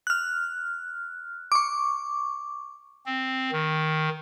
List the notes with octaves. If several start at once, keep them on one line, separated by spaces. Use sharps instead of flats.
F6 F#6
C#6 D6
C4
D#3